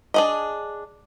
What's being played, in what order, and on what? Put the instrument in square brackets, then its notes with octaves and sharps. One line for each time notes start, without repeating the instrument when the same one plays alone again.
[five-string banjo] D4 G#4 D#5